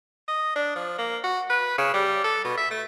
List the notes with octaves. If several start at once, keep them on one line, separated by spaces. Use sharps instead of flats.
D#5
D4
F3
A#3
F#4
B4
C#3
G3
A4
B2
E5
A3